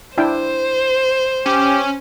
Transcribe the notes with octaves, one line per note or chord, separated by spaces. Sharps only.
D4 E4 C5 G5
C#4 G4